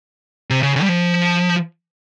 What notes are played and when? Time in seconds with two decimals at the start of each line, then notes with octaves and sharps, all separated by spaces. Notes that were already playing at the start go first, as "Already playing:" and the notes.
0.50 C3
0.63 C#3
0.76 C#3
0.82 G3
0.89 F3